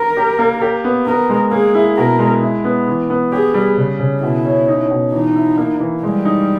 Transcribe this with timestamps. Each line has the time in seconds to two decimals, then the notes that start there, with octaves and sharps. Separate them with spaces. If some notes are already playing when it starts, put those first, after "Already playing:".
Already playing: A#4
0.17 G4
0.39 A#3
0.61 G4
0.84 B3
1.07 B3 A#4
1.30 G#3
1.51 A#3 G#4
1.75 E4
1.97 B2 A#4
2.19 G#3
2.42 E4
2.64 B3
2.88 E3
3.10 B3
3.32 G4 G#4
3.54 G3
3.77 C#3
3.99 C#3
4.22 B2 E4
4.45 C#4
4.68 D#4
4.91 B2
5.12 E3 D#4
5.36 E4
5.58 A#3
5.80 E3
6.03 G3 G#3
6.25 D#4